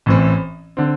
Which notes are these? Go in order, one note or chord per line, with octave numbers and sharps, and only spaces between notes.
A1 A2 E3 C4
D3 C4